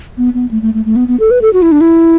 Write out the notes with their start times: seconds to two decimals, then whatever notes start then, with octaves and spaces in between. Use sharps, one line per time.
0.18 B3
0.34 B3
0.51 A3
0.62 A3
0.74 A3
0.85 A3
0.96 B3
1.08 B3
1.20 A4
1.31 B4
1.42 A4
1.53 F#4
1.62 E4
1.72 D4
1.81 E4